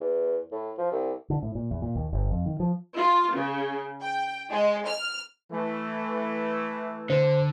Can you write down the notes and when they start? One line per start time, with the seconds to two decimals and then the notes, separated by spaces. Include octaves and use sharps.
0.01 E2
0.52 A2
0.78 F3
0.92 C2
1.30 D3
1.43 A2
1.55 A#2
1.71 E2
1.82 A#2
1.95 D#2
2.13 G1
2.31 F2
2.46 D#3
2.60 F3
2.96 F4
3.34 C#3
4.01 G5
4.51 G#3
4.87 F6
5.51 E3 A3
7.10 D3 C5